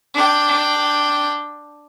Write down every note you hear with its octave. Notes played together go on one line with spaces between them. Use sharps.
D4 G5